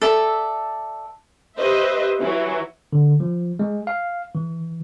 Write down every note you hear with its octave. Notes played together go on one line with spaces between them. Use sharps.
A4 D5 E5
G4 B4 C5 D#5 E5
E3 F#3 E4
D3
F3
G#3
F5
E3